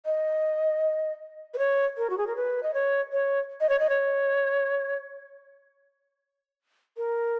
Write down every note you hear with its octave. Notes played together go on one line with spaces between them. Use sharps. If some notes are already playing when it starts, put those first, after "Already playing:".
D#5
B4
C#5
A#4
F#4
G#4
A#4
B4
D#5
C#5
C#5
D#5
C#5
D#5
C#5
A#4